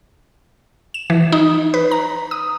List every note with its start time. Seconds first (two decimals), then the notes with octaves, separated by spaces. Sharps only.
0.94 E7
1.10 E3
1.32 D#4
1.74 B4
1.91 A#5
2.31 D#6